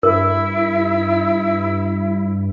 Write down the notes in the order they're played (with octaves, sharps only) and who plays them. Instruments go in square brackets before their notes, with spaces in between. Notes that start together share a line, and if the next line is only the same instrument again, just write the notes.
[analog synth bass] G2 [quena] E4 [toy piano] A#4